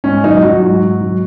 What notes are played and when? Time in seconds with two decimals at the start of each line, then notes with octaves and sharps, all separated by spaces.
0.04 G#2 C#4
0.23 F#3 D#4
0.43 F#3 F#4
0.61 G#2 F#4
0.82 G#2
1.00 F#3